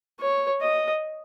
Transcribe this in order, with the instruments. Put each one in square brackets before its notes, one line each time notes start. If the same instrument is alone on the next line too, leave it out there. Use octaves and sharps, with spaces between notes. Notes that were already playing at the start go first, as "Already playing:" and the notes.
[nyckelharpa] C#5
D#5